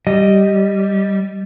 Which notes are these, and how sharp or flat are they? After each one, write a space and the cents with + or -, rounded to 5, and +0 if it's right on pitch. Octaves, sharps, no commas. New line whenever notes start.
G3 -5 D#5 +0